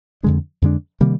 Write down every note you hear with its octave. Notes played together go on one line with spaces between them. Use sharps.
F2 D3 G#3 D4
F2 D3 G#3 D4
C3 D#3 G3 A#3